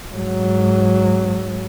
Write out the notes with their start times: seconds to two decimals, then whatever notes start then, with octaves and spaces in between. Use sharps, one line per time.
0.12 G#2 F#3